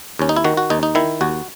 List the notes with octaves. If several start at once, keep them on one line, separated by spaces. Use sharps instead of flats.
D#2 C#4
D#4
E4
D#3 F#4
F#4
D#2 D#4
D#4
D#3 E4
D#2 F#4